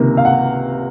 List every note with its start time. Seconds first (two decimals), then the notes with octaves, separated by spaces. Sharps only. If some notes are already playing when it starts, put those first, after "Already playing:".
Already playing: C#2 C3 D#3 A#3
0.17 F5
0.25 F#5